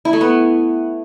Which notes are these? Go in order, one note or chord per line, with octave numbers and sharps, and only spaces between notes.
E4
A3
B3